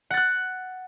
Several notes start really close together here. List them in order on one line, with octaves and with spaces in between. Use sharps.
F#5 A6 F#6